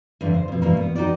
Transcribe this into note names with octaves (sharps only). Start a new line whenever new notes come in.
E2 G2 D3
C5
F2 B2
G2 B2 E3 A#3 E4
B3
D#4 F#4 G4 D5